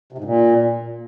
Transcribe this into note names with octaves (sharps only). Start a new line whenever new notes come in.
C3
G#2
A#2